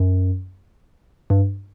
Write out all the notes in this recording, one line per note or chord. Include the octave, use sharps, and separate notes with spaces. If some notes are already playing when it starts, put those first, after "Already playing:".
Already playing: F#2
G2